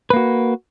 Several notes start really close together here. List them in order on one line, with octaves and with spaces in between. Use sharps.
B4 A#3 F#4